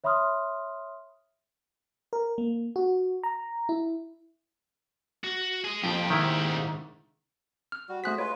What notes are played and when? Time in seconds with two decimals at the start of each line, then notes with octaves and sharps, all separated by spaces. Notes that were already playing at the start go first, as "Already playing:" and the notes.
0.04 C#5 E5 B5 C6 D#6 F6
2.13 A#4
2.38 A#3
2.76 F#4
3.23 A#5
3.69 E4
5.24 F#4
5.65 G#4 D#5
5.84 F2 A#2 G4
6.10 C#2 G#2 D#3 E4
7.72 F6
7.89 G3 F#4
8.04 A3 F#4 G#4 C5 F#6 B6
8.18 G#3 F4 B4 C#5